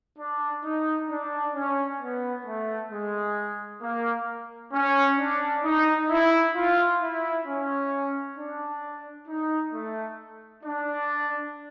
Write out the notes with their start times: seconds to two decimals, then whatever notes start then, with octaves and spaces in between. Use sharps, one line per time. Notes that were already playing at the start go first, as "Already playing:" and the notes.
0.18 D4
0.63 D#4
1.09 D4
1.54 C#4
2.00 B3
2.45 A3
2.91 G#3
3.82 A#3
4.73 C#4
5.18 D4
5.64 D#4
6.10 E4
6.55 F4
7.00 E4
7.46 C#4
8.37 D4
9.27 D#4
9.73 A3
10.64 D4